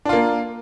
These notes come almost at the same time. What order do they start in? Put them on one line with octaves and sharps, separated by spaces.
D4 F4 A#3